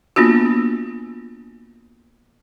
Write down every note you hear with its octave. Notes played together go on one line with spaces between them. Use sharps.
A#3 B3 D4 F4 F#4